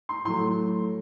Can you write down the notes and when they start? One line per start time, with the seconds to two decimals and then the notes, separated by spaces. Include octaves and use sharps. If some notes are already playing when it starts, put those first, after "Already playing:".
0.09 C6
0.24 A2 F#3 A3 C6